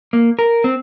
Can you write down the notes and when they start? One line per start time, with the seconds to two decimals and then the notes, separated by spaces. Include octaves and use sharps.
0.13 A#3
0.39 A#4
0.64 C4